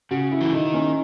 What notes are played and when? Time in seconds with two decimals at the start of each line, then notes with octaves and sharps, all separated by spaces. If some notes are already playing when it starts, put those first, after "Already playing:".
0.11 C#3 F#4
0.32 E4
0.41 E3
0.52 D#3 D#4
0.74 C#4